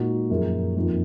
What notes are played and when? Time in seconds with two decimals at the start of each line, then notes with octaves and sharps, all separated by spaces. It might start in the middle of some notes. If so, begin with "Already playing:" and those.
Already playing: A#2 G#3 D#4 F#4
0.30 F#2 F3 A#3 F4 G#4
0.77 F2 D#3 A#3 F4